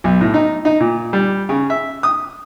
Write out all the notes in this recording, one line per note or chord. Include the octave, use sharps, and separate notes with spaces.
B1
A2
D#4
D#4
A#2
G3
C#3
E5
D#6